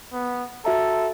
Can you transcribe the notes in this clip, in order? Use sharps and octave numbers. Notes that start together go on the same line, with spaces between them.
B3
F#4 A4 E5 A#5